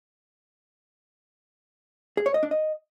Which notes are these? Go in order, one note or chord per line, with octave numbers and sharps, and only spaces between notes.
G#4
C#5
D#5
D4
D#5